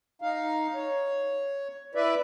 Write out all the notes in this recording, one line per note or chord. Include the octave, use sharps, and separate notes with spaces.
D#4 F5
C#5
E4 B4 D5 E5